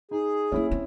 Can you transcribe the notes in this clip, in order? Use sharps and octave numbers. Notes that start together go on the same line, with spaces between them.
D#4 G#4
A#3 C#4 D4 E4
C4